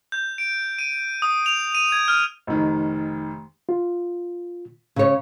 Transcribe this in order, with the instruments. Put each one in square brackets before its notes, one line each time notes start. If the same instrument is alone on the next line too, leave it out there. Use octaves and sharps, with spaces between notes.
[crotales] G6
D7
D#7
D#6
F7
D#7
G#6
F6
[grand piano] F1 D#3
[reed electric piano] F4
[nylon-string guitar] C#3 C#5